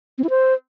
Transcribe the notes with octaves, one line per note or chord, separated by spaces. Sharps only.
C4
E4
C5